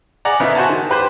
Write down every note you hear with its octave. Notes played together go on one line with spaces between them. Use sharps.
G#4 D5 F#5 A#5
C#3 B3 D#4 E5
F#4 C5 F#5 G#5 A5
D#3
G4 B4 C5